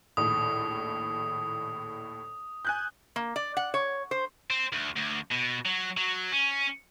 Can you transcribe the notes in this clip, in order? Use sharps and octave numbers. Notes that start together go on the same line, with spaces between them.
A#1 D#2 A2 D#6
G#5 F#6 G6
A#3
D5
F#5
C#5
C5
C4
D2
D2
B2
F#3
F#3
C#4